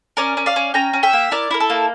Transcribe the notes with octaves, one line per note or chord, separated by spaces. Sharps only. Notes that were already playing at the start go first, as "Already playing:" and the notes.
C#4 A#4 D5
C#4
D5 F5
C#4
C#4 G5 A#5
C#4
E5 G5
A#3
E4 A#4 D5
E4 A#4
A4
A#3